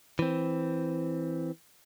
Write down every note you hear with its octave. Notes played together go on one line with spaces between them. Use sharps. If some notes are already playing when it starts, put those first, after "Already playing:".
E3 C4